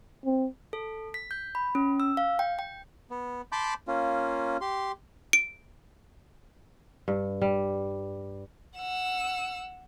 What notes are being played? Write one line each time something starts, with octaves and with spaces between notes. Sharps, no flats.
C4
A4
B6
G6
B5
C#4
E6
F5
G5
G5
B3
A5 B5 C6 D6 G6
A#3 C#4 F4
G4 C6
D7
G2
G3
F#5 E6